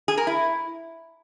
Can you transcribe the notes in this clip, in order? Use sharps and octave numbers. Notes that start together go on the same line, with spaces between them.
G#4
A#4
E4